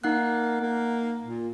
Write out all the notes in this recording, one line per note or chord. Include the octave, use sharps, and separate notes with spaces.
A#3 D#4 F#5 F#6
A#3
A#2